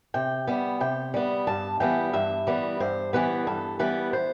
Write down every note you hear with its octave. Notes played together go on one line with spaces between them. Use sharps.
C3 G5
G3 B3
C3 G5
G3 B3
G2 A5
E3 G3 B3 G5
G2 E5
E3 G3 B3
G2 C5
E3 G3 B3 B4
G2 A4
E3 G3 B3 B4
C5